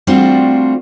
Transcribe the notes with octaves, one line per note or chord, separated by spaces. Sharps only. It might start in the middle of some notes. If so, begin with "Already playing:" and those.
G3 A3 C4 D4 F4 F#4